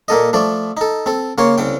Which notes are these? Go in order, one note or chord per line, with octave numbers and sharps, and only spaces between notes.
A#2 A#3 A4 D#5
F3 A3 D5
D#4 A4
C4 A4
C#3 A#3 C#5 C6
C2 C#3 G5